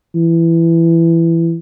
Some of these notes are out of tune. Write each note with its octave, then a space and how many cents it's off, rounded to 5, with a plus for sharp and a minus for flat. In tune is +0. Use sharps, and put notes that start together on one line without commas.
E3 +15